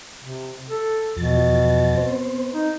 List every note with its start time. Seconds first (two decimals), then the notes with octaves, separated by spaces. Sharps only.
0.21 C3
0.70 A4
1.16 E2 B2 F3 A6
1.97 B3 C4 C5
2.54 D#4